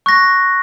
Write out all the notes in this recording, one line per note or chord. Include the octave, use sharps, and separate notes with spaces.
C#6 F#6 A#6